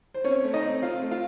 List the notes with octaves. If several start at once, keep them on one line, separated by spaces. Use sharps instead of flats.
C5
C4 C#4 C#5
A3
D#4 D#5
C4
C4 F4 F5
A3
F4 F5